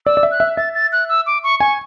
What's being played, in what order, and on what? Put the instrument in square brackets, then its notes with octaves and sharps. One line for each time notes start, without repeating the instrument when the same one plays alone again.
[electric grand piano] D5 [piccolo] E6
[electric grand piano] D5
E5
[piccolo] F#6
[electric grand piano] E5
[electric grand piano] E5 [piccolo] A6
[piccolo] A6
F#6
E6
D6
C#6
[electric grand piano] G#5 [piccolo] C#6